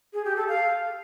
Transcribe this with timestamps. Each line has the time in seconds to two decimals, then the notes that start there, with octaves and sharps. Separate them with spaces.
0.13 G#4
0.25 G4
0.37 A4
0.48 F5